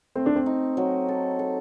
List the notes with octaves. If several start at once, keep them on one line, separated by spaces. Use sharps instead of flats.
A3 C4
D4
C4
D#4
F#3
A4
A4